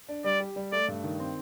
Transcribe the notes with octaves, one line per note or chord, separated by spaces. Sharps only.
D4
G3 D5
G4
G3
A3 D5
G2
D#3
C4